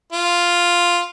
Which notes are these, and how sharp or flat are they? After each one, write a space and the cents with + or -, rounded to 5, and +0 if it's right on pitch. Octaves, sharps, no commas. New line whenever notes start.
F4 +0